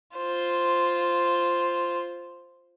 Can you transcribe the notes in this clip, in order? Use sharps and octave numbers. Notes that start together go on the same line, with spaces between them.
F4 C5